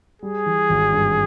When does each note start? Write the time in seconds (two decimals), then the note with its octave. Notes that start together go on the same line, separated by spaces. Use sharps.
0.22 G3 G#4
0.46 E3
0.69 G#1
0.93 G2